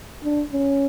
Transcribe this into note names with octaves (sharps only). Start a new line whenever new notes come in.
D4
C#4